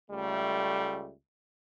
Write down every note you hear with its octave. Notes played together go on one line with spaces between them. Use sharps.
C#2 G3 A3